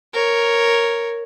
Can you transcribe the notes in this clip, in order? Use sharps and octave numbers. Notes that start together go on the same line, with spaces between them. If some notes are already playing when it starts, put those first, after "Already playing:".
A#4 C#5